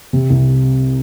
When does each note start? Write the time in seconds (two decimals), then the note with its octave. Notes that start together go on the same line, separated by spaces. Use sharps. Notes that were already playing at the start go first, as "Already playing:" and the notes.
0.13 C3
0.30 C2